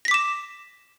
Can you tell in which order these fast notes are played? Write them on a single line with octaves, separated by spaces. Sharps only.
A#6 B6 D6 E7